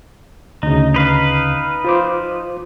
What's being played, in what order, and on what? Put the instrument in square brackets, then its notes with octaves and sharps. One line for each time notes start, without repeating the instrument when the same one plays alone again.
[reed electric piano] D2 C#3 [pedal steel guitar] D#4
[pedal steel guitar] D#4 B4 F5
[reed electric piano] F4 C5 D6